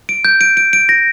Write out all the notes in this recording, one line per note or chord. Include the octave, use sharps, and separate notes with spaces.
D7
G6
D7
D7
D7
A#6